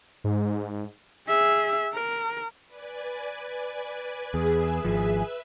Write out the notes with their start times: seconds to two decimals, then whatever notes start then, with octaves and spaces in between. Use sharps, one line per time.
0.24 G#2
1.27 G#4 E5
1.94 A#4
2.66 B4 D5 G#5
4.34 E2 G#4 B4 E5
4.85 G#1 F3